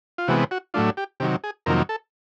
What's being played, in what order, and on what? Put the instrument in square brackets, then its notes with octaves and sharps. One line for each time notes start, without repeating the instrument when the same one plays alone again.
[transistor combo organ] F4
C3 E3 G#3 B3 F#4
F#4
A2 F#3 A3 D4 F4
G4
C3 D#3 F#3 G4
G#4
F2 C3 D#3 F#3 A#3 A#4
A4